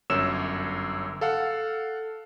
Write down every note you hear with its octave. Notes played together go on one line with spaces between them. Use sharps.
G1 F#2 C#5 E6 E7
A4 F5 F#5